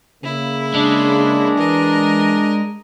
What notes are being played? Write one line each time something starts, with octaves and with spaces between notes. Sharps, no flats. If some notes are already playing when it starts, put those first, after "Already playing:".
C#3 A#3 E4
G#3 D4
E3 A#4 D#5